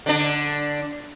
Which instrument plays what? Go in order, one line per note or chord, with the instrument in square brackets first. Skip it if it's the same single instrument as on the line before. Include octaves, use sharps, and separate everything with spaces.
[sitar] D3 D4